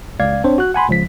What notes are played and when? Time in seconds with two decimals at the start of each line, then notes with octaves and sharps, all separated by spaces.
0.20 C#2 D5 F5 G#6
0.44 C4 D4 C5 C#5
0.58 F#4 F#6
0.74 F#5 G#5 B5 C6
0.89 C#2 F3 B6